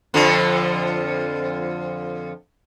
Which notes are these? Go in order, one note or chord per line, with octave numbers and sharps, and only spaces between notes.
F2 D3 F3